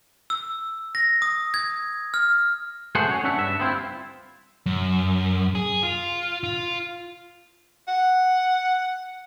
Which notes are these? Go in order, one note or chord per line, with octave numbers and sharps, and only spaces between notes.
E6
A#6
D#6
G#6
F6
A3 G#4 C5 F#5
C#4 F#4 C#5
C#4 D4 E5 F#5
G2 E5
B3 C4 E4 F4
F#2
G#4
F4
F4
F#5